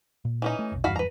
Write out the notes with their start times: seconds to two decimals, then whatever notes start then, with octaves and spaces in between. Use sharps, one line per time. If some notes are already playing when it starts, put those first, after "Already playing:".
0.25 A#2
0.42 E3 C#4 D#4
0.59 A3
0.72 F1 B1
0.84 F#1 E2 G2 F#4 F5 B5
0.96 B4 A#5